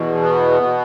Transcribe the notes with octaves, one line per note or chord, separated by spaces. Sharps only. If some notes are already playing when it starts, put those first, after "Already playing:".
Already playing: E2 B2
B3
B2